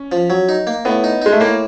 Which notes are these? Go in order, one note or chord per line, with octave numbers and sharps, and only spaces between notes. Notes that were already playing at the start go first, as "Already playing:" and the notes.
Already playing: C#4
F3
F#3
D#4
A#3
A2 B3
D#4
G#3 D#4
A3
A2 A#3